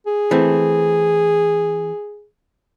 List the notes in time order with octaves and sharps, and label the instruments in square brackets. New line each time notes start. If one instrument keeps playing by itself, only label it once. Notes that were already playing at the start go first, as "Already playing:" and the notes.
[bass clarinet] G#4
[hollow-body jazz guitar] E3 A3 C4